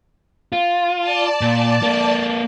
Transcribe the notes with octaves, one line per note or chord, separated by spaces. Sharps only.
F4
D5 A5
A#2
A#3 A4